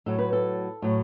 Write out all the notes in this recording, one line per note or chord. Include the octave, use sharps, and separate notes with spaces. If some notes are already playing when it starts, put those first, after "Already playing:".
A2 F#3 A4
B4
A4
A2 F#3